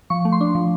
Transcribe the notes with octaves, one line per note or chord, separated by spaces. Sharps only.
F3 C#6
A3
C6
D4
F3